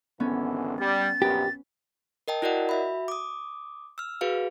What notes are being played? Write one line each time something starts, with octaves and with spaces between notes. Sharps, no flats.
G#1 D3 E3 B3 C#4
G3 A6
A#1 F#2 B3 G4
A#4 D#5 G5 A5
E4 F#4 A#4 D5 D#5 F#5
F#4 E5 B5
D6 D#6
E6 F6
F#4 G#4 B4 F5